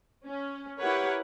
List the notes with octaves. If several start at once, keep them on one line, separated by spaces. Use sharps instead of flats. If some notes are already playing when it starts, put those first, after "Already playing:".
C#4
E4 G4 A#4 B4 C#5 F#5